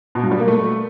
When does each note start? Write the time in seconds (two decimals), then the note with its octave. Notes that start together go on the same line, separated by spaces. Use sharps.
0.15 B2
0.23 G2
0.31 G3
0.40 A#3
0.48 A3